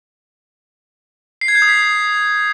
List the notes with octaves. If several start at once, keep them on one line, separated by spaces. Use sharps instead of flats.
C7
G#6
G6
D#6
B6